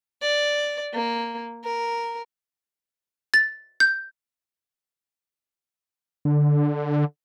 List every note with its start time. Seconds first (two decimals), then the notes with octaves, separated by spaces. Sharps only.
0.22 D5
0.93 A#3
1.64 A#4
3.34 A6
3.80 G6
6.25 D3